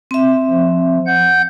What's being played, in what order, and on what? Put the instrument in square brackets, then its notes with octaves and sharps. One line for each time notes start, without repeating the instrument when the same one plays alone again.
[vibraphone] C4 E5
[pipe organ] F3
F#5 G6